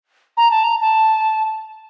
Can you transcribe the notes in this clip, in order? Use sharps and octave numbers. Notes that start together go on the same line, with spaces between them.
A#5
A5
A#5
A5